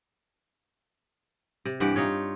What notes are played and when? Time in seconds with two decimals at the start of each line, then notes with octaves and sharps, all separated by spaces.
1.65 C3
1.80 G2 E3 G4 F#5
1.96 D#4 F4 C#5